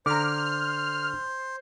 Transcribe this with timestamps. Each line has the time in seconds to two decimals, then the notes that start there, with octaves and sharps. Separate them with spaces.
0.06 D3 C5 A#5 D6 F6